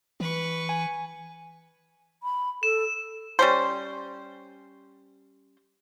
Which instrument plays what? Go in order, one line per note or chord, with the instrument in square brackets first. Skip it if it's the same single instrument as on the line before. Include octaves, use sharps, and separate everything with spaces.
[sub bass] E3 [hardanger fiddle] B4 C#6
[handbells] G#5
[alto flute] B5
[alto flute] A4 [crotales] E7
[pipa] G3 C#4 C5